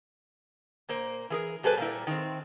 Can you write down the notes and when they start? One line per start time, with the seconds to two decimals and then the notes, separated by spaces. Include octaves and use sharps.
0.89 A#2 A#3 C5
1.30 E3 G#4 A#4
1.63 B2 G3 G#4 A4 B4 C5
1.77 A#2 G3 A#3 E4
2.07 D#3 C4